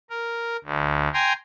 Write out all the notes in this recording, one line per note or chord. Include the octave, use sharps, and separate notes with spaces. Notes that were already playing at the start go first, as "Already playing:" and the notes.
A#4
D2
G5 G#5 A#5 C6